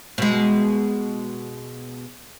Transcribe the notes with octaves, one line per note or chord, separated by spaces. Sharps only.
B2 G#3